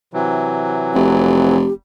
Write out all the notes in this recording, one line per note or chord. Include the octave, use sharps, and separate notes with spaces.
C3 E3 F#3
F1 G4